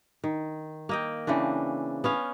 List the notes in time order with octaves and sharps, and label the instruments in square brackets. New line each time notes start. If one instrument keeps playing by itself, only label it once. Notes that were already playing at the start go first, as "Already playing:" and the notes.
[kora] D#3
A#3 D#5 G5
C#3 E3 C4 D4
B3 C#4 F5